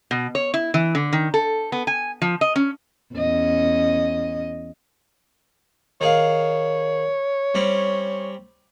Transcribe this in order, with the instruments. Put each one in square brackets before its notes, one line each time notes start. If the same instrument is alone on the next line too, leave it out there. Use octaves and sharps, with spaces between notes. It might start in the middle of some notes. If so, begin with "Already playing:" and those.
[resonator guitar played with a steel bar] B2
C#5
E4
E3
D3
D#3
A4
B3
G#5
F3
D#5
C#4
[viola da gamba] E2 C#4 D#5
[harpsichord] D#3 G#4 F5 [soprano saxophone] C#5
[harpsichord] G3 C4 C#4